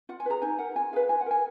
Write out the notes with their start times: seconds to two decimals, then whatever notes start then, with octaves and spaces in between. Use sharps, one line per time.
0.09 F4 F#5
0.20 G#5
0.26 G#4 B4 A#5
0.42 D#4 G#5
0.59 A#4 F#5
0.75 F4 G#5
0.93 G#4 B4 F5
1.09 F4 G#5
1.21 F#5
1.26 A#4 G#5